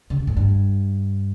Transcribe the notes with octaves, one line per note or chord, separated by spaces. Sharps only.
C#3
A#2
A2
G2